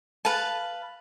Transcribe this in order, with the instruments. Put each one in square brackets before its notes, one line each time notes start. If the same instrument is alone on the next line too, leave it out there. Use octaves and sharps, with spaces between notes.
[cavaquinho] B4 F5 A5